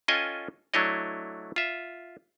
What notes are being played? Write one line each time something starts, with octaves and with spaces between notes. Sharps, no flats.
C#4 F4 A4 D#5 G5 G#5
F#3 A3 D4 E4 C#5 D#5
F4 E5